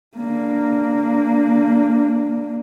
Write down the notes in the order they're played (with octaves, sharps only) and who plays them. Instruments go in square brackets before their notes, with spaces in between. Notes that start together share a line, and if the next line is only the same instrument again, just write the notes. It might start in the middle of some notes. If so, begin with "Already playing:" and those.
[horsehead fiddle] A#3 D4